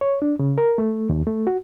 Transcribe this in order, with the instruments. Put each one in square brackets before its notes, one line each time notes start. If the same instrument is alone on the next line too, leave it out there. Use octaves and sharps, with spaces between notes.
[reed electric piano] C#5
D4
C#3
A#4
A3
D#2
A3
F#4